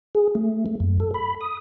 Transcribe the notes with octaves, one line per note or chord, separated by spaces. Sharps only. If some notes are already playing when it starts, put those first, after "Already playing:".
G#4
A3
A3
F#2
A4
B5
D#6